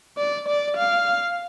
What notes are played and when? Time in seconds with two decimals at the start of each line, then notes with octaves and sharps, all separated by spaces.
0.18 D5
0.48 D5
0.77 F5